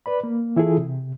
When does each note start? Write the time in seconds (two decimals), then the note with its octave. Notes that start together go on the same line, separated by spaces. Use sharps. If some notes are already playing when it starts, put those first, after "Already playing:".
0.06 B4 D5 B5
0.24 A#3
0.56 E3 E4 F4 G#4 A4
0.78 C3